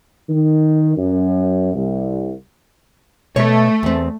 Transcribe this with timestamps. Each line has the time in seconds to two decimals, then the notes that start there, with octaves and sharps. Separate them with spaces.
0.29 D#3
0.97 F#2
1.74 C2
3.36 B2 A3 C#5
3.83 E2 C4